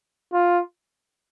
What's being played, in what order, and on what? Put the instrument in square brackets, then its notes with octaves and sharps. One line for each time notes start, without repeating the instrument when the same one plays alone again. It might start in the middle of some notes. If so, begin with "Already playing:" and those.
[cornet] F4